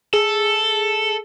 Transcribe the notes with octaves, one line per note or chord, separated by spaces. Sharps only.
G#4 A4